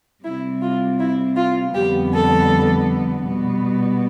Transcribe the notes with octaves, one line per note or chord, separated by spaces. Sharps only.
C3 G3 C4 E4
F4
E4
F4
F2 D3 G3 B3 G4
A4
B2 G3 B3